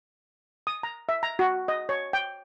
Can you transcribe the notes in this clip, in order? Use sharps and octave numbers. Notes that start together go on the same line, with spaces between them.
D#6
A#5
E5
A#5
F#4
D#5
C#5
G5